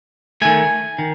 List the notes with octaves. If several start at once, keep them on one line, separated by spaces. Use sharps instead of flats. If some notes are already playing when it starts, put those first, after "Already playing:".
D#3 A3 G#5
D#3